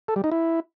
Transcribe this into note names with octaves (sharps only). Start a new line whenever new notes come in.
A4
G3
D#4
E4